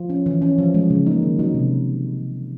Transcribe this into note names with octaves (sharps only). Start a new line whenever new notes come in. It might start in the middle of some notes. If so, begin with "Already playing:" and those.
Already playing: F3 F4
C#4
E3
C#4
F3
G#3
C#3
A#3 D#4
D#3
F#3 D#4
C3